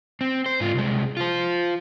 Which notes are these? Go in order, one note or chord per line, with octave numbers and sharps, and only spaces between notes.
C4
C5
G#2 F4
C2 G#3
F4 C5